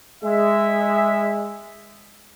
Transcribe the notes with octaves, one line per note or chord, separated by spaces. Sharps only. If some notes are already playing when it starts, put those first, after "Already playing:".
G#3 E5